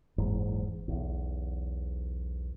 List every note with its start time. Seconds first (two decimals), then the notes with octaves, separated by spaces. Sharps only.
0.18 F#1 E2 G#2
0.88 B1 E2